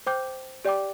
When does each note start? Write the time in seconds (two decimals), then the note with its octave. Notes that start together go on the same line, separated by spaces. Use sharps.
0.07 C5 G5 D6 G6
0.65 G4 D5 G5 D6